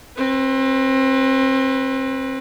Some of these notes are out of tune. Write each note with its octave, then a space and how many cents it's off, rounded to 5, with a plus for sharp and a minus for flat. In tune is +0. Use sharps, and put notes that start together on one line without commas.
C4 +30 B4 +0